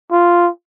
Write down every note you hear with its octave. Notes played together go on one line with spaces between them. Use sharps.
F4